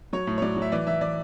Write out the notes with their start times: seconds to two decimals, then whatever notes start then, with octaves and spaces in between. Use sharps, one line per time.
0.13 F#3 C#5
0.27 A2
0.38 C#5
0.42 F#3 D5
0.57 F#3
0.62 E5
0.72 E3 D5
0.87 E3 E5
1.01 E3 D5